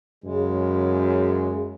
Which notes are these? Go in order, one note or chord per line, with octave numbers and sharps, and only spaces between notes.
F#2 C#3 G#3